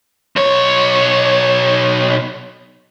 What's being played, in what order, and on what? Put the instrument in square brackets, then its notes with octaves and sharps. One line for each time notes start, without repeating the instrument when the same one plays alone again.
[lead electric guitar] B1 C#5